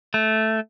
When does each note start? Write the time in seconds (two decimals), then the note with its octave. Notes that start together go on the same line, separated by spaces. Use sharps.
0.14 A3